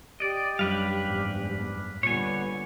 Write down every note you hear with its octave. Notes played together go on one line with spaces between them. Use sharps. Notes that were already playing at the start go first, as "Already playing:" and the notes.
G4 D5 D#5
F#2 G3 D4 B4 F5
E2 G#2
A#2 D3 G3 B3 C#5 G#5